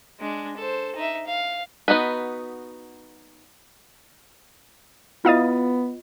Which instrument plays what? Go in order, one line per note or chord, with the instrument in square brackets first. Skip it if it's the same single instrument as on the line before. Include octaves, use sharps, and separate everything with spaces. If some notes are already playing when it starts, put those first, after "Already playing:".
[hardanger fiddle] G#3 D4
A4 C5
D#4 E5
F5
[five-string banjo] B3 D#4 F#4 B4
[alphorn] B3 [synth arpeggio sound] E4 F5 D#6 [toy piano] F4 D#5